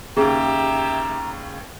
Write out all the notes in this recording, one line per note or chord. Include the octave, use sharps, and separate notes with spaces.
D#2 C#3 G4 G#4 E5 A#5